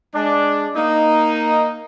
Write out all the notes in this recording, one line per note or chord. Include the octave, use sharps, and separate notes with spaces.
G#3 D4
A#3 D#4